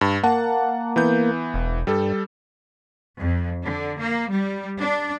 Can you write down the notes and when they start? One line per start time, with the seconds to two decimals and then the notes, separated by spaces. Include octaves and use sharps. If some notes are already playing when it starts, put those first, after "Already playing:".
0.01 G2
0.24 A#3 F#5 A5
0.96 E3 B3 G6
1.54 E1
1.87 G2 G3 A4
3.19 F2
3.65 D3
4.01 A#3
4.32 G3
4.79 D4